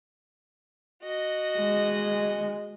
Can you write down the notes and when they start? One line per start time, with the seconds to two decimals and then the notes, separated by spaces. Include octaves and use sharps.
1.03 F#4 D#5
1.59 G#3